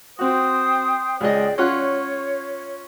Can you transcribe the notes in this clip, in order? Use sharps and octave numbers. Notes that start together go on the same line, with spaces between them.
C4 F#4 C5 G5 D#6
C#2 G#4 D5 D#5 G5
C#4 F4 C#5 F#5